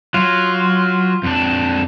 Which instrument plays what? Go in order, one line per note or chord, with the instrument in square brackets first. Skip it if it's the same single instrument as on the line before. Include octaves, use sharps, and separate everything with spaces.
[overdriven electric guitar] F#3 [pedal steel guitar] F4
[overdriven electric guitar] F2 D4